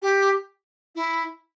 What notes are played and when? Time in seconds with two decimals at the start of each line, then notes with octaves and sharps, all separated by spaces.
0.02 G4
0.95 E4